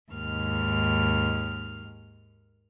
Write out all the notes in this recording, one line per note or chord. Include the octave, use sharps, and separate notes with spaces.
D#2 G#2 F6